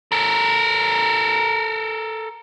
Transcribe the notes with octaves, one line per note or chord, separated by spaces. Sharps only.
A4 A#4